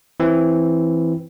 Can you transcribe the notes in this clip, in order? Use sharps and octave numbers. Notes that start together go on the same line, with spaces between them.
E3 C4